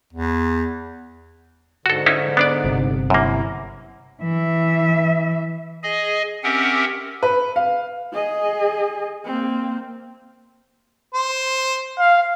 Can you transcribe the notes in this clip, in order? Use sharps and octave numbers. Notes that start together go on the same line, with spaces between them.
E2
G#2 D3 F#4 A4
C#4 D#4 E4
B3 D4 D5
G1 C3
F#2 A#3 E4
E3 E5
G#4 D#5 G#5
C4 C#4 G4 A#4 E5 F#5
B4
F5
G#4 D#5
A#3 C4
C5
F5